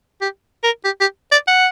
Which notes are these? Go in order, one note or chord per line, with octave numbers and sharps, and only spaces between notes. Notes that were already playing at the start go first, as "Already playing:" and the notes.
G4
A#4
G4
G4
D5
F#5